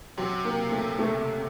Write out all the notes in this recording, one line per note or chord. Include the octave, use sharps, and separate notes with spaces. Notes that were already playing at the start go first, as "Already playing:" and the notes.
C3 F#3
A#3
A3
A3